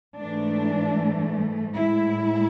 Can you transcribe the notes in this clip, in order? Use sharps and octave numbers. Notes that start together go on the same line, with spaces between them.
G#2 E3 A3 D4
A2 G#3 E4